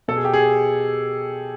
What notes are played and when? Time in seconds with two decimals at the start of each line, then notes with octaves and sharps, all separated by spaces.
0.08 B2 A4
0.17 G#4
0.25 G4
0.34 G#4